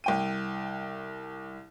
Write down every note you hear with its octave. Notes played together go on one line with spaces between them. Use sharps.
C2 G5 D#7